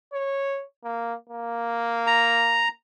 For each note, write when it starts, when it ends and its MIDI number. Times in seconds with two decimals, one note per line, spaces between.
0.13 0.63 73
0.84 1.14 58
1.30 2.71 58
2.07 2.68 82